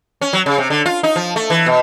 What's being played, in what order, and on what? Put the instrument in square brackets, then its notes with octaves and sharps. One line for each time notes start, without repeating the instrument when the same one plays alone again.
[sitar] C#4
F#3
C#3
C3
D3
F4
D#4
F3
A3
E3
B2